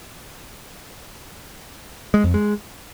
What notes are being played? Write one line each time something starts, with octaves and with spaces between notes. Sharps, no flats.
G#3
F2
G#3